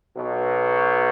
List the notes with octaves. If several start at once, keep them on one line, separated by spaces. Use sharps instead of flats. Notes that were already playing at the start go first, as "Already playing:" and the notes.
B1 B2